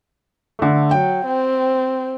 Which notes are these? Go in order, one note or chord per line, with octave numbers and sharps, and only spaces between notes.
D3 A3
F#3 G5
C4